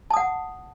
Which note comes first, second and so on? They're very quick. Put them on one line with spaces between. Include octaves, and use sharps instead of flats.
A5 D#6 F#5